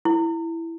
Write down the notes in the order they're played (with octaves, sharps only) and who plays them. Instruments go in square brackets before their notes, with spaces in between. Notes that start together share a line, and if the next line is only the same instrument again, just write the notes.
[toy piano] E4